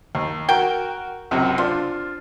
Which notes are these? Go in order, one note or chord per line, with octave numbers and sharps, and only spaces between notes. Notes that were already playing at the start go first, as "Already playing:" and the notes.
D#2
F#4 A#4 G5
C#2 F#2 C3
D4 F4 C5